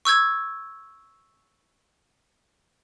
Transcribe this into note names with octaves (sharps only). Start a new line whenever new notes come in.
C#6 E6 G6 G#6